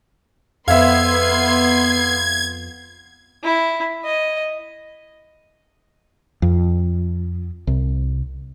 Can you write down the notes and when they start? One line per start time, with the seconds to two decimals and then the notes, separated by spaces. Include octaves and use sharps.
0.68 F2 B3 E5 F5 C6 G#6 C7
3.44 E4
4.05 D#5
6.42 F2
7.67 C2